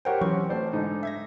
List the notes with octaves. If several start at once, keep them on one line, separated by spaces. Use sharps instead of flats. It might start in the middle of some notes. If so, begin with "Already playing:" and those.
G4 A#4 C5 C#5 F#5 G5
E3 F#3 C4 C#4 C#6
A1 C5 D5
G#2 D3 D#4
E5 G#6 A#6